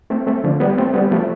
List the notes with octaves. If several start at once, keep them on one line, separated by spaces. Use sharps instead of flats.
A3 C4
A3 C4
D3 F3
G3 B3
A3 C4
G3 B3
F3 A3